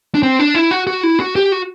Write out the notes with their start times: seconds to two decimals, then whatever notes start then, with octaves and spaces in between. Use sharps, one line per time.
0.15 D4
0.23 C4
0.39 D4
0.55 E4
0.71 F#4
0.87 F#4
1.03 E4
1.20 F#4
1.36 G4
1.52 F#4